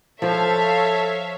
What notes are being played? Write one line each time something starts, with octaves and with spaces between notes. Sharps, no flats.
F3 A4 C5 C#5 E5 F5